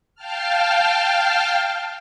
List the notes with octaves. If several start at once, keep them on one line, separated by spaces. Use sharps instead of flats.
F5 G5 A5 F6